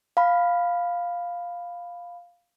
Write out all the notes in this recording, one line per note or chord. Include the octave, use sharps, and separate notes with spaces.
F5 B5